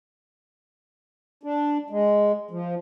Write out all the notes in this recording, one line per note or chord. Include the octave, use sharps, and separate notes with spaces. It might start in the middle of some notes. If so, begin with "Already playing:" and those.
D4
G#3
F3